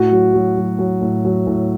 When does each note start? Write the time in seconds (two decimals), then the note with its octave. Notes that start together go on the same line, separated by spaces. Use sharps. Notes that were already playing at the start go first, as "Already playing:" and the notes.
Already playing: A2 F#4
0.12 F#3
0.34 F#3
0.57 F#3
0.79 F#3
1.01 A2
1.25 F#3
1.47 A2